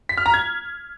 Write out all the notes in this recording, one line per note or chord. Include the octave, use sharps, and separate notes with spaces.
B6
F6
A#5
G#6